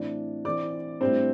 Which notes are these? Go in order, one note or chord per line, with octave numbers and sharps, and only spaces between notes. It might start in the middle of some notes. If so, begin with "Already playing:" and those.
Already playing: A2 E3 C4 D4 D5
E3 C4 D5 D6
A2 G3 C4 D4 C5